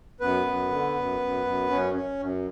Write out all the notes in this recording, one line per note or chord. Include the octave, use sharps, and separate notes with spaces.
F#2 B3 B4
F#2
D3
F#2
F#2
F#2
F#2 C#4
C#4
F#2